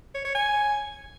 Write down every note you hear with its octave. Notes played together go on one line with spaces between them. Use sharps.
C#5
C#5
G#5